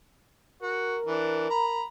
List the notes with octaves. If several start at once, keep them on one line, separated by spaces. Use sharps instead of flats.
F#4 A#4
E3 D4
A#5 B5